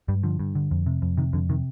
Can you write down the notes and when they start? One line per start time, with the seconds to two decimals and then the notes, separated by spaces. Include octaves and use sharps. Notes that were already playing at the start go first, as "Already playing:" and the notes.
0.08 G2 G3
0.23 D3 F3
0.39 G2
0.55 D3
0.71 F2
0.86 C3
1.02 F2
1.17 C3 D#3
1.33 F2 D3
1.49 C3 D#3